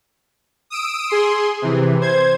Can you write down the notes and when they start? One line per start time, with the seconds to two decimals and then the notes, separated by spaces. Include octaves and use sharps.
0.70 D#6 E6 D7
1.09 G#4 C6
1.62 C3 E3
2.01 C5 G#6